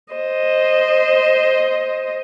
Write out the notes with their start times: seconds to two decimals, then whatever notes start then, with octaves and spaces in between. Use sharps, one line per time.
0.13 C5 D#5